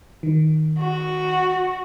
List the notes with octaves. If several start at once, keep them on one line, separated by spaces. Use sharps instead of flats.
D#3
F#4